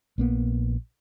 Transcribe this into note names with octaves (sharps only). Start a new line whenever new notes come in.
A#1 A#3 B3